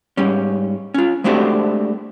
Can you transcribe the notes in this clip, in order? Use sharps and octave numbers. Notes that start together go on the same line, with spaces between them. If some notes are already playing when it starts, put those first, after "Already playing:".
G#2 G3 C#4
C#4 F4
G#3 A3 C4 D4 F#4 G4